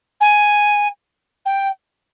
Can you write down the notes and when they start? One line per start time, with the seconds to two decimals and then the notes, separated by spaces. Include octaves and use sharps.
0.20 G#5
1.45 G5